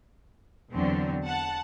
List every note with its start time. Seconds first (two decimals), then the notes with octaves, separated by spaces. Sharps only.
0.72 E2 D3 F#3 C4
1.25 F#5 A5